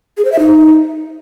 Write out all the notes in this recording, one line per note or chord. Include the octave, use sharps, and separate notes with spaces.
G#4
C5
E5
D#4